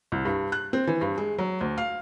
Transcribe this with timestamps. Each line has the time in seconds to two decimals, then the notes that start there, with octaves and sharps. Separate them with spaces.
0.12 C2
0.25 G2
0.52 F#6
0.73 C4
0.87 E3
1.01 G2
1.18 G#3
1.38 F#3
1.61 D2
1.78 F5